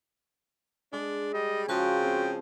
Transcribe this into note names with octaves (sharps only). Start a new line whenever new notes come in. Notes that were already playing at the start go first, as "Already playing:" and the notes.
G#3 D4
G3 D#5
C#3 F3 F#4 G5 C6 C#6
C4 C5